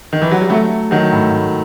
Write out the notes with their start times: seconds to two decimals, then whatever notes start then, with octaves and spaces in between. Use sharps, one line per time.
0.13 D#3
0.22 E3
0.32 F#3
0.41 G3
0.50 F#3 A3
0.91 D#3 F#3
1.12 A2
1.31 A2